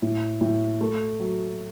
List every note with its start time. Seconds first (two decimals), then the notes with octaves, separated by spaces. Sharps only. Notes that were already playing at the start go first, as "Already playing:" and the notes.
0.02 A2
0.41 A2
0.81 A3
1.19 F#3